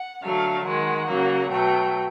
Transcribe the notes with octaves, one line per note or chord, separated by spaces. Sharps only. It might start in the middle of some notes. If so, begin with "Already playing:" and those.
Already playing: F#5
D3 F#3 A3 F5
D#3 G#3 F#5
C#3 F#3 A#3
B2 F#3 A3 G5